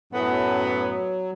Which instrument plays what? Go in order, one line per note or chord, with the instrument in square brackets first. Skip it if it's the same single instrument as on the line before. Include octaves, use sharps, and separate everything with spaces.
[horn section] F#2 A2 B3 [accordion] F#3